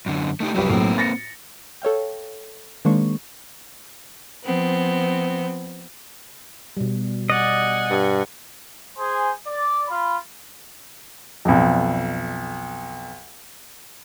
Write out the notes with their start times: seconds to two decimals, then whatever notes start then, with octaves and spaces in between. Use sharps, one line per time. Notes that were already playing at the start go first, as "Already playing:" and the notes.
0.06 F#2 D3
0.40 A3 D#4 G4
0.54 C2 F#2 F#3 G4 B4
0.69 B1 F#2 A2 A#3 C4
0.98 A6 A#6 C#7
1.82 A4 C#5 F5 G5
2.85 D#3 G#3 A#3 D4 C5 C#6
4.44 F3 B3 C4
6.77 B2 G3
7.30 D5 D#5 F#5 G#5
7.90 G2
8.99 G#4 C5 G#5
9.47 D5
9.89 F4 B5
11.45 B1 F2